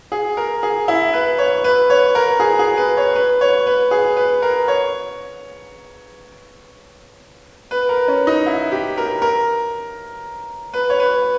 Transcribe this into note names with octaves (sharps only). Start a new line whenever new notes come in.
G#4
A#4
G#4
E4
B4
C#5
B4
C#5
A#4
G#4
G#4
B4
C#5
B4
C#5
B4
G#4
B4
A#4
C#5
B4
A#4
C#4
D#4
E4
G4
A#4
A#4
B4
C#5
B4